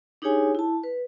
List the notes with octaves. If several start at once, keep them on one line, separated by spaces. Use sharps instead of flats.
D4 D#4 G4 G#4 C#5 G#5
E4 A5
B4